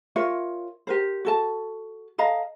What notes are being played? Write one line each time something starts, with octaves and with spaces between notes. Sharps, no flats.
F4 A#4 C#5 E5
G4 A#4 C5
F#4 A4 A5
A4 D#5 F5 A#5